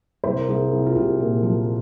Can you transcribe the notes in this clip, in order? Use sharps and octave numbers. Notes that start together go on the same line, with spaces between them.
C2 C5
A#4
C2 G#4
C2
F4
C2 G4
A#2
F3